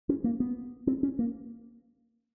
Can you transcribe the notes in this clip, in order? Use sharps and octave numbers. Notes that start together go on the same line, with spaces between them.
C#4
A#3
B3
C4
C#4
A#3